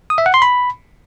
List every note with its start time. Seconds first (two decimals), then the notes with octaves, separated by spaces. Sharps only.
0.10 D#6
0.18 E5
0.26 F#5
0.34 C6
0.42 B5